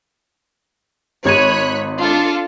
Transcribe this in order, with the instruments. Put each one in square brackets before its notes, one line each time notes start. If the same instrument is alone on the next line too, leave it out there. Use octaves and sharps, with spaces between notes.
[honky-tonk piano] G#1 G#6 D#7 [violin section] C#5 B5 F#6
[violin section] D4 F4 A4